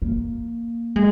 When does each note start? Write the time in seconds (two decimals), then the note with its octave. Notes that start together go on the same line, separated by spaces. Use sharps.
0.02 A#3
0.96 G#3